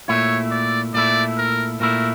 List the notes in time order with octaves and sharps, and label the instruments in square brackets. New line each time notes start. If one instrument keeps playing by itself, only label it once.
[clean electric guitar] A#2 A3 E4 [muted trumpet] C#5
[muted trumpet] D5
[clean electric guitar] A#2 A3 E4 [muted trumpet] D5
[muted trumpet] A#4
[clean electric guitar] A#2 A3 E4 [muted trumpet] A#4